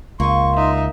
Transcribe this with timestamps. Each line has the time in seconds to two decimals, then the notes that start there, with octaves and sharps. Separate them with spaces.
0.20 C#2 A#3 D#5 C6 C#6
0.56 D#4 E5